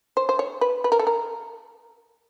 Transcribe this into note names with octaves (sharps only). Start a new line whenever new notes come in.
C5
C5
C#5
B4
B4
A#4
A4
A#4